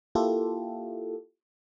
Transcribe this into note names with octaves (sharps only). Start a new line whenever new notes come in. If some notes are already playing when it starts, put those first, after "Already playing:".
A#3 E4 F4 G4 A4